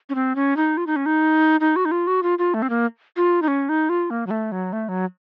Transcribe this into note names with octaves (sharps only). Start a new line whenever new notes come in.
C#4
C4
C#4
D#4
F4
D#4
C#4
D#4
D#4
F#4
D#4
F4
F#4
F4
F4
A3
C4
A#3
F4
D#4
C#4
D#4
F4
A#3
F#3
A3
F#3
A3
F#3